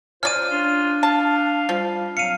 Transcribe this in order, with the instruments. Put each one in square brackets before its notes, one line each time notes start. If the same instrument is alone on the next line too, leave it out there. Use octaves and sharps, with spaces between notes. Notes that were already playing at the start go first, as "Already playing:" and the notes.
[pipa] C#4 D5 [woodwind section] F4 C5 [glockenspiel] F6 D#7
[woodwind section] D4 [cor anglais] F4
[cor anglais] F5 [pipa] A5
[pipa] F3 [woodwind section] G3
[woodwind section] F#3 C4 [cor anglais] F5 [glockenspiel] C#7 D#7